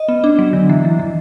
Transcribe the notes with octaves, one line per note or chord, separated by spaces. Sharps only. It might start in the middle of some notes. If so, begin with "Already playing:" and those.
Already playing: D#5
B3
D4
F#3
D3
E3
E3
E3